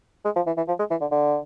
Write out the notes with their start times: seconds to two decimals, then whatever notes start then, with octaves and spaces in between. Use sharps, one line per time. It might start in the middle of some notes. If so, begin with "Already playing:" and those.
0.25 G#3
0.36 F3
0.46 E3
0.57 E3
0.68 F3
0.79 G#3
0.91 E3
1.01 D3
1.11 D3